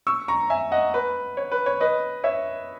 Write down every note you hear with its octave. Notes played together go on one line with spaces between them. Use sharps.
C#6 E6
A#5 C#6
E5 G#5
D#5 F#5
B4
C#5
B4
C#5
B4 D#5
C#5 E5